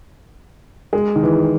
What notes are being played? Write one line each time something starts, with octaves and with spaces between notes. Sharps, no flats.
G#3
D#3
E3